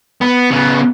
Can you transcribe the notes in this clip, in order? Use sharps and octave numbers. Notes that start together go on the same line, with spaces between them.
B3
C#3 B3